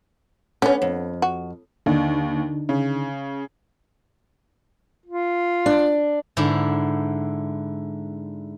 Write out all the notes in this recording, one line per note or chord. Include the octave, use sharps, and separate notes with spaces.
D3 B3 C#4
F2
F#4
D#2 D3 D4 D#4
C#3
F4
D4
G#2 D3 D4 E4